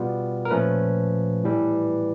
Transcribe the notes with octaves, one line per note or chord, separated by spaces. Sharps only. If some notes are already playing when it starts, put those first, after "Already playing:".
Already playing: B2 G3 B3 F4
A#4
A#2 F3 A3 C#4 B4
A2 E3 G3